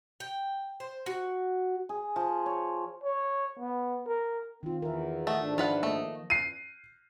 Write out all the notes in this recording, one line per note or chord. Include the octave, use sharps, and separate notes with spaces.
G5
C5
F#4
G#4
F3
C#5
C#5
B3
A#4
D#3 C4 F4
E2 E3 A#4 E5
A#2 A3 D#5 F#5
G#2 D4 E5
F3 F4 B4 F#5
A3 A#3 D#5
C7 D#7